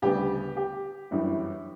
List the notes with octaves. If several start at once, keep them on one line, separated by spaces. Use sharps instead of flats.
D2 C#3 G3 B3 G4
G4
G1 F#2 E3 G3